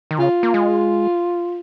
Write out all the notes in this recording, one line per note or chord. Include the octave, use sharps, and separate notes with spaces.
D#3
C#3 F4
A#3
G#3